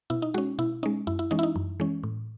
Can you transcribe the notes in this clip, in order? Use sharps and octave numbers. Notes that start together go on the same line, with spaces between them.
B2 E4
D#4
G#3 C#4 F#4
B2 E4
G#3 C#4 D#4
F#2 E4
E4
E3 G#3 C#4 D#4
E4
D#4
F#2
E3 G#3 C#4
A2